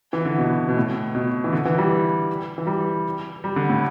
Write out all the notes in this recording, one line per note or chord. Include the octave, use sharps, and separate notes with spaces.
E3
D3
B2
B2
A2
B2
E3
D3
E3
G3
E3
G3
G3
D3
A2